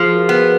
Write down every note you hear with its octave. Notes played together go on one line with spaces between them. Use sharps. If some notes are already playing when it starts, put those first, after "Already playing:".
Already playing: F3 F4 G#4
F#4 A#4
B3 G#4 B4